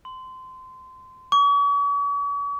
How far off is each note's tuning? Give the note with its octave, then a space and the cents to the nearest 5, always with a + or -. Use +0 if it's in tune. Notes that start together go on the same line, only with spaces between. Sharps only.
C6 -20
C#6 +45